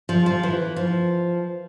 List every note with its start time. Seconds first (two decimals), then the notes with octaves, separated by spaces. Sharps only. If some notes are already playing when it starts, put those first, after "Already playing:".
0.09 F3
0.26 F3
0.43 E3
0.76 F3